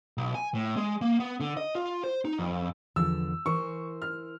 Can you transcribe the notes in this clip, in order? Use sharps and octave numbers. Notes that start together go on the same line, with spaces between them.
B1
G#5
A2
G#3
A#3
B3
D3
D#5
F4
C5
D#4
F2
E2 D3 F3 E6
E3 A#4 C5 C#6
F6